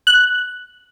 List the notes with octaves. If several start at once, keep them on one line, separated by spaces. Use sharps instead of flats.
F#6